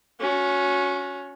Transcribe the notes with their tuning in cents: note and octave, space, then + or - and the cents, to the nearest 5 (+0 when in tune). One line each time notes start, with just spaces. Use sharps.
C#4 +15 F#4 -20